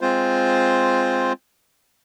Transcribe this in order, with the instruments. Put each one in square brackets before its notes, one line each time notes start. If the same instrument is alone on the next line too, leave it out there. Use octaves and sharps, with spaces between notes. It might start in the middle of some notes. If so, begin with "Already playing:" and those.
[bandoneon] G#3 C4 F4 C5